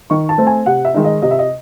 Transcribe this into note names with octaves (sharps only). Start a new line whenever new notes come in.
D#3 C#6
A5
A3 C4
G#5
C3 F#5
E5
D#3 G#3 D#4
D#5
C3 D#5
E5
D#5